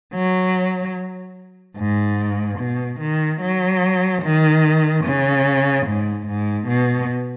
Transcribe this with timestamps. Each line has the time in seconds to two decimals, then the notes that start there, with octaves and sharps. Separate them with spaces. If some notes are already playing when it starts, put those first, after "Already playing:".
0.14 F#3
1.78 G#2
2.59 B2
3.00 D#3
3.41 F#3
4.23 D#3
5.05 C#3
5.87 G#2
6.28 G#2
6.68 B2